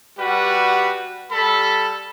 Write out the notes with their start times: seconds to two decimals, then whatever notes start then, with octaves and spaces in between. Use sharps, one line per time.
0.18 G3 F#4 G4 B4
1.31 G3 A4 B5